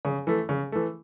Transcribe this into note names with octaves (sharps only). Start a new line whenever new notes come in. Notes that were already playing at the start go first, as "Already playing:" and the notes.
C#3
E3 A3
C#3
E3 A3